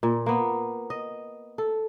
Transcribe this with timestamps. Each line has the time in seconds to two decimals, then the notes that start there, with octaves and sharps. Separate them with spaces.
0.03 A#2
0.26 A#3 B3
0.90 D#5
1.58 A4